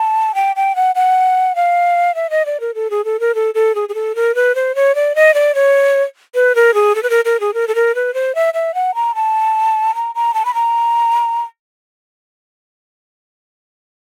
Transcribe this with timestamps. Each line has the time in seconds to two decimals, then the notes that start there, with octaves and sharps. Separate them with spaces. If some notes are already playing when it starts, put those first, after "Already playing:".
Already playing: A5
0.35 G5
0.56 G5
0.76 F#5
0.95 F#5
1.55 F5
2.15 E5
2.30 D#5
2.46 D5
2.60 A#4
2.75 A4
2.90 G#4
3.05 A4
3.20 A#4
3.35 A4
3.55 A4
3.75 G#4
3.89 G#4
3.94 A4
4.15 A#4
4.35 B4
4.55 C5
4.75 C#5
4.95 D5
5.15 D#5
5.34 D5
5.55 C#5
6.35 B4
6.55 A#4
6.74 G#4
6.95 A4
7.03 B4
7.10 A#4
7.25 A#4
7.40 G#4
7.54 A#4
7.68 A4
7.75 A#4
7.95 B4
8.14 C5
8.35 E5
8.54 E5
8.74 F#5
8.95 A#5
9.15 A5
9.95 A#5
10.15 A#5
10.34 A5
10.45 B5
10.54 A#5